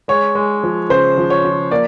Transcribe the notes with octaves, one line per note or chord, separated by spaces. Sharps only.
G#3 C#5
G#3
F3
C#3 C5
F3
C#5
F3
A#3 D5